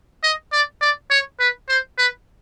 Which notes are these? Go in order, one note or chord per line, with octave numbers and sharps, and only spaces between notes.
D#5
D5
D5
C#5
B4
C5
B4